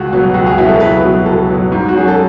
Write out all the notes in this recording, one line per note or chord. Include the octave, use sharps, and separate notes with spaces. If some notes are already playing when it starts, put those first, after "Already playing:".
Already playing: C#2 F#4
B2 F#3 B3
C#2 F#4
G#4
B2 F#3 B3 E4
A4
C#2 B4
B2 F#3 B3
C#2 A4
B2 F#3 B3
G#2
F#4
F#3 C#4 G#4
A4